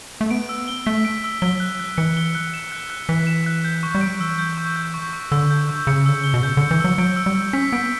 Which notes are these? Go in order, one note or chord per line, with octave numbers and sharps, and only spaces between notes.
A3
B3 D7
E6
G7
A3 B6
D7
E6
F#3 G7
F#6
F#6
E3 C#7
G7
F#6
E7
F#6
F#6
E3 B6
E7
F#6
G6
C#6
G3
D7
F#3
E3 E6
G6
C#6
G6
C#6
C#6
D3 E6
G6
C#6
C#3 C#7
D3 E6
C#3
G7
B2
C#3 G6
D3 C#7
E3
F#3 E6
F#3 D7
E6
G3
E6
C#4 B6
B3 D7